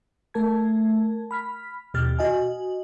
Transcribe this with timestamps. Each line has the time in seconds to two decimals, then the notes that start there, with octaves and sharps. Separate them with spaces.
0.34 A3 A#4 A5 G#6
1.31 B5 F6 B6
1.94 D#2 B2 G4 F6 A6
2.19 F#4 D#5 G#5